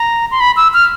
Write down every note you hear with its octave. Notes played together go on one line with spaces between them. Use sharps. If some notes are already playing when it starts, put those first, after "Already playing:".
Already playing: A#5
C6
B5
E6
F6